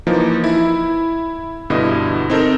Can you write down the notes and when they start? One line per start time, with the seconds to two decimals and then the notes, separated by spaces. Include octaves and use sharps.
0.07 E3 F3 A#3 D#4
0.44 E4
1.70 G2 B2 D3 E4 D#5
2.30 C4 D#4 A4 A#4